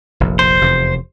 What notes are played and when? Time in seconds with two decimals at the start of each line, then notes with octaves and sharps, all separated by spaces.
0.20 F1 A#1
0.39 C5
0.61 F1 E2 C3